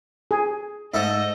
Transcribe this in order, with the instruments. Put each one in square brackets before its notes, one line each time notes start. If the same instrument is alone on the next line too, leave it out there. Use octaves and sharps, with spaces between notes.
[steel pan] G#4
[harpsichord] G#2 A4 E5 [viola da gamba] A3 D#5